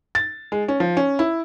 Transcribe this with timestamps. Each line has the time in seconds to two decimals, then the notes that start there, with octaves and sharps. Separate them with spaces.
0.15 A6
0.52 G#3
0.68 C#4
0.80 F3
0.97 C#4
1.19 E4